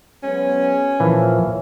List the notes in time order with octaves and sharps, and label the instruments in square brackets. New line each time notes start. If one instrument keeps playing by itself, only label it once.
[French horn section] F#3 G#3 B3 [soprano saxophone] C#4
[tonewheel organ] A#2 F3 [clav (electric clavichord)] E3 [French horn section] C#5